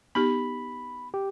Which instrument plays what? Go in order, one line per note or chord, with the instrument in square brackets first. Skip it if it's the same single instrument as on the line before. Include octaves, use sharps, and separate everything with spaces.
[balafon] B3 D#4 G4 [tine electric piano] B5
[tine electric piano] G4